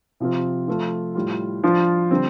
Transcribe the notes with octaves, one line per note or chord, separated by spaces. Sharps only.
C3 F3 C4 F4
F3 A3 F4
A2 G3 F4
F3 D4 F4
D3 G3 C4